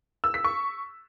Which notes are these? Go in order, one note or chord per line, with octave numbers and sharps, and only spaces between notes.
E6
B6
C#6